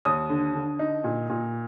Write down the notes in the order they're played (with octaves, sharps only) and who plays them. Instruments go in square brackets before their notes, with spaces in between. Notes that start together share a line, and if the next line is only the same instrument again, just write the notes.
[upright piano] D#2 D#6
D3
D3
D#4
A#2
A#2